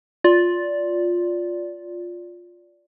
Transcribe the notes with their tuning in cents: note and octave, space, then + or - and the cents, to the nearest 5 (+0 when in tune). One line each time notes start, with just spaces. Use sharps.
F4 +10 D5 -15